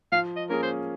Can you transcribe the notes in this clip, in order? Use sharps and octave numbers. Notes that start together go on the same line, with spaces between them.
F3 F5
D#5
A#3 C#4 G#4 A#4
C5